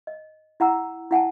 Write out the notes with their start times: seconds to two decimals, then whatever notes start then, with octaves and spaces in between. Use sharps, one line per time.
0.07 D#5
0.60 E4 F#5 A#5 E6
1.11 E4 F#5 G#5 A5